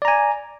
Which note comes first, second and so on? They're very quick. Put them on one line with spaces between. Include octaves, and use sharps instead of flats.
D5 A#5 G#5